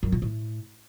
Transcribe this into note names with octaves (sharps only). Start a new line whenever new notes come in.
F#2
A#2
A2